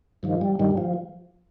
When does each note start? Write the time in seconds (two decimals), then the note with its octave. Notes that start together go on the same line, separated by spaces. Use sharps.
0.23 G2 D#3 F3
0.41 G3
0.59 G2 D#3 G3
0.78 F3